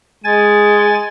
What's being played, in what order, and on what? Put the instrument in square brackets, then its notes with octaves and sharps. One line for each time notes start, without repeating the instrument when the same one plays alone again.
[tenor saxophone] G#3 [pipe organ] G#5 A6